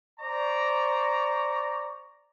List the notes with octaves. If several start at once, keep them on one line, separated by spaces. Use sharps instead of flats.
C5 D5 A#5 C#6